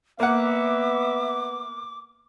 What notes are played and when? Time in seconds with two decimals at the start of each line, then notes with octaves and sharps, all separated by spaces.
0.20 A#3 B3 E5 F#5 D6